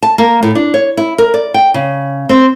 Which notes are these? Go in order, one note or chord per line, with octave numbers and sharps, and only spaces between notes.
A5
A#3
A2
D4
C#5
E4
A#4
D5
G5
C#3
C4